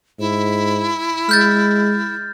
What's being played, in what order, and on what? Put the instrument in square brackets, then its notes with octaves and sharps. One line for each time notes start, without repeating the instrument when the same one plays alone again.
[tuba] G#2 [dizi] E4
[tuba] G#3 [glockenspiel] F6 G6 A6